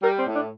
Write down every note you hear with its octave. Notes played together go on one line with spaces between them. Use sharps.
G3 A#4
C4
A2
D4